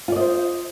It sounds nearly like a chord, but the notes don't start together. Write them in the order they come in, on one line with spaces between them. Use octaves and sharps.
F4 D5 D#5 C5